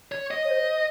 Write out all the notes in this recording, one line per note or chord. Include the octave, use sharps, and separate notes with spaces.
C#5
D#5
C#5
C5